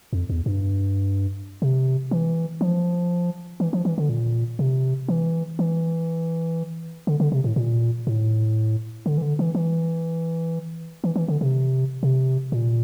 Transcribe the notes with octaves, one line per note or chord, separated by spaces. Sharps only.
F2
E2
G2
C3
E3
F3
E3
F3
E3
D3
A#2
C3
E3
E3
D3
D3
C3
A2
A#2
A2
D3
E3
D3
E3
E3
E3
E3
D3
C3
C3
A#2